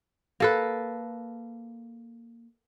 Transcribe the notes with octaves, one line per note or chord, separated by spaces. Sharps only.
A#3 A4 B4